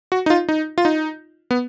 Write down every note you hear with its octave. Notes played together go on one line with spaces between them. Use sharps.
F#4
D#4
F4
D#4
F4
D#4
B3